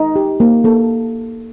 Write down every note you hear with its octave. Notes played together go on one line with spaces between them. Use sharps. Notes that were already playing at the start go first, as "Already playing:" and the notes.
Already playing: D#4
G4
A#3
A#3 A4